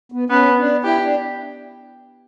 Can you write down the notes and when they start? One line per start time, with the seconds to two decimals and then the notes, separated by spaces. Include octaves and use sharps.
0.12 B3
0.30 B3 C#4
0.58 D4
0.84 E4 G4
1.03 D4